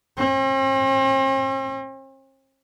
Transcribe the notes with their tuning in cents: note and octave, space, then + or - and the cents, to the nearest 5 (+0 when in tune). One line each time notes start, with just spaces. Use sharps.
C4 +45